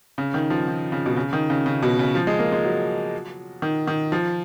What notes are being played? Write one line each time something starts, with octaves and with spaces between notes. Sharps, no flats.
C#3
D#3
F3
D#3
C#3
B2
C#3
D#3
C#3
C#3
B2
C#3
F3
G#3
A#3
G#3
F#3
D#3
D#3
F3